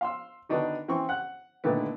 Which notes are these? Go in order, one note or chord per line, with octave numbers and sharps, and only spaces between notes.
F5 C6 E6
D3 D#3 B3 D4 D#4 F#4
E3 C4 C#4 C#6
F#5 F#6
A#2 D3 D#3 A3 B3